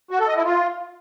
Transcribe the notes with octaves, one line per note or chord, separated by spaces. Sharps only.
F#4
A4
D#5
E4
F4